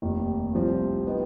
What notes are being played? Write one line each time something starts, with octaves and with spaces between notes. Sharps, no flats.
F1 D#2 D#3
C2 C3 F3 C4
D#3 B3 D#4